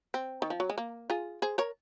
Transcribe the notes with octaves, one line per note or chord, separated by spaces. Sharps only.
C4
D#3
F3
F#3
G#3
A#3
F4 G#4
G#4 C5
A#4 C#5